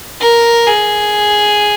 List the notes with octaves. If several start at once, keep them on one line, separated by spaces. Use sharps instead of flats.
A#4
G#4